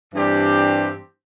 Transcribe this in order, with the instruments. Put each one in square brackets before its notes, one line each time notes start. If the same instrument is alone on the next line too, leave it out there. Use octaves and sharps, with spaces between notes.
[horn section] G2 E3 G3 C4 G4